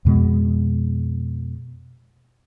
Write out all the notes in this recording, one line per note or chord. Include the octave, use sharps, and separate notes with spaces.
F2 B2 G#3